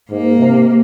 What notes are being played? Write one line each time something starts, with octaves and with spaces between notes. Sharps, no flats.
G#2 A#3
C3